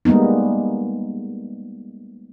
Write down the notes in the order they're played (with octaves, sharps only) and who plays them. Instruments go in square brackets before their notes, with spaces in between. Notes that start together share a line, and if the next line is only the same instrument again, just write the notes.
[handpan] G3 G#3 A#3 B3 D#4